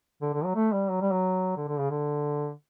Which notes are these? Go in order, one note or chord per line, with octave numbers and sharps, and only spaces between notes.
D3
D3
F#3
A3
G3
F#3
G3
F#3
D3
D3
C#3
D3